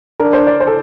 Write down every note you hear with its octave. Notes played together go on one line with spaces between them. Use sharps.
D4 A#4
C5
D5
C5
A4